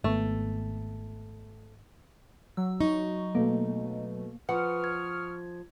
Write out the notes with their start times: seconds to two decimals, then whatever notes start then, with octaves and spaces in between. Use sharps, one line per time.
0.04 G#1 A3 B3
2.57 F#3 E6
2.80 D#4 C#6
3.35 B2 A3 A#3
4.49 F3 B4 F#5 C#6 D#6 F6
4.84 G#6